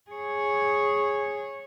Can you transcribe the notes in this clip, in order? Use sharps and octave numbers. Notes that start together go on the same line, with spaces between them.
G#4 C#5